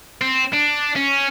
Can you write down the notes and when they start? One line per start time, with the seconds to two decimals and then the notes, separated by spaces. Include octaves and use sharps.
0.21 C4
0.53 D4
0.96 C#4